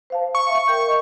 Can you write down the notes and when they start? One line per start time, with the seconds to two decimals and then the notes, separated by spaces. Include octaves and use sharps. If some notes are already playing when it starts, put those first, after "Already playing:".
0.10 C5 F5 A5
0.35 C#6
0.47 E5 F5
0.68 A#4 G5 G6
0.88 D#5